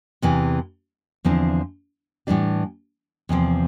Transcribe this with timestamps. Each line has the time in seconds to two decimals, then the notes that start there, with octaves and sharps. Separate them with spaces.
0.22 E2 C3 E3
1.25 E2 D3 F3 C4 E4
2.27 A2 E3 G3 D4 G4
3.29 E2 C3 F3 C4